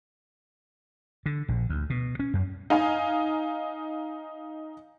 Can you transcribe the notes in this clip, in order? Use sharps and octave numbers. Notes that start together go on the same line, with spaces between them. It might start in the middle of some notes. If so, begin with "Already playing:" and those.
D3
A#1
D2
B2
C#4
F#2
D#4 F5 G#5